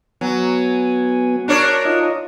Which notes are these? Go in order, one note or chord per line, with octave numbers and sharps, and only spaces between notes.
F#3 B3 G#5
D4 A#4 C#5
D#4 F4 D#5